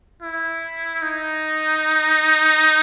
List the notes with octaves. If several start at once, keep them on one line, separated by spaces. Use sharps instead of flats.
E4
D#4